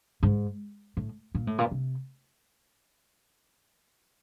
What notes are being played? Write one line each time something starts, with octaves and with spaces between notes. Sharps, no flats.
G#2
A2
A#2
A2
A#2
C3